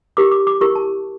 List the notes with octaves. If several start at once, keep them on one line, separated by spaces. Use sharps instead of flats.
E4 G4 A#4 D6
D6
D6
E4 G4 A#4 C#6
A5